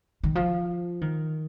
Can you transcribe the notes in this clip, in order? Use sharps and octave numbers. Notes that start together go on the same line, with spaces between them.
D#3
F3
D#3